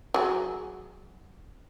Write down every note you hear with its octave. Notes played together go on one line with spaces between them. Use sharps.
F#3 G#4